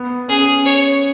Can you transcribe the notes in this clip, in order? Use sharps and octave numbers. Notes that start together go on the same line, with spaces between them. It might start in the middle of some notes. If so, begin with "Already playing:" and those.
Already playing: B3
C#4 G#4
C#5